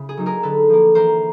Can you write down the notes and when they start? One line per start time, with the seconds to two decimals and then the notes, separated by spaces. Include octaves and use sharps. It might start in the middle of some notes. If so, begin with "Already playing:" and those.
Already playing: C#3 E4
0.09 G#4
0.17 F#3 A#3 D#4
0.26 G#4 A#4
0.43 D3 A4 B4
0.70 F3 A#3
0.95 E3 A#4 C5